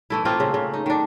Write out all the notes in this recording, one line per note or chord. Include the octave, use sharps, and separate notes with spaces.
E3 A3 E4
A3 A#3 C4 F4
C#3
C#3
D#4
D#3 D4